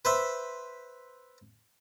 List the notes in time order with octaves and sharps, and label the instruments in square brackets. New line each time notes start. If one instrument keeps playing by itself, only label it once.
[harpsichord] B4 C5 E5